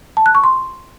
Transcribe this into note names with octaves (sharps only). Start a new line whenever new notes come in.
A5
F#6
C#6
C6